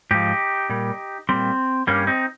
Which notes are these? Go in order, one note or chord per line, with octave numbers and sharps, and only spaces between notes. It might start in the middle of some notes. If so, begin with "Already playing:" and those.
G#2 F3 D#4 G4
A#2 G3
A#2 G3 C4
G2 G3 A#3 C#4
C4 D#4